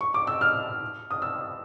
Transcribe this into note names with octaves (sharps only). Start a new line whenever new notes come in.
C#6
D6
E6
F6
D#6
E6